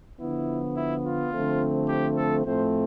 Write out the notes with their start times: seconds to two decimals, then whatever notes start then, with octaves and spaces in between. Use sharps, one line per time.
0.20 D3 F3 B3 E4
0.76 E4
1.04 F4
1.32 D3 F3 A3 C4
1.88 G4
2.16 A4
2.45 A2 F3 A3 C4 C5